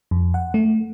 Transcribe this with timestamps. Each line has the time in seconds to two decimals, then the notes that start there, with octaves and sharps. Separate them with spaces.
0.11 F2
0.34 F#5
0.54 A3